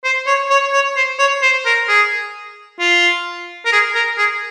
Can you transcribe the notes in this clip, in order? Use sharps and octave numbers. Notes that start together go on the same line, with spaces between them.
C5
C#5
C#5
C#5
C5
C#5
C5
A#4
G#4
F4
A#4
G#4
A#4
G#4